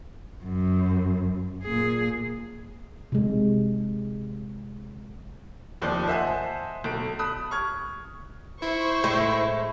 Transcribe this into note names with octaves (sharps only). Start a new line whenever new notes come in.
F#2
A#2 G#4
C3 G#3
F1 D#2 F3 D5
C5 D#5 E5 F#5 G#5 A5
B1 A4 D7
A5 B5 D#6 F#6
C#6 F6 G#6
E4 C5 C#6
A2 G#3 A3